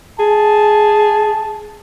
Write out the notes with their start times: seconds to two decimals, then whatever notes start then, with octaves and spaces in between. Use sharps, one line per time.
0.20 G#4 A5